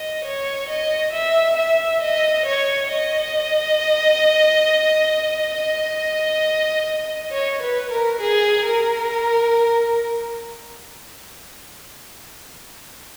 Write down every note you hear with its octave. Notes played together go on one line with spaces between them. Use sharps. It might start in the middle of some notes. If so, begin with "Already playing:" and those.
Already playing: D#5
C#5
D#5
E5
E5
D#5
C#5
D#5
D#5
C#5
B4
A#4
G#4
A#4